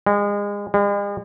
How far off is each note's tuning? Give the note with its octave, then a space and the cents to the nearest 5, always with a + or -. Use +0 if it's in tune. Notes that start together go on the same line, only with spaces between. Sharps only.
G#3 -30
G#3 -45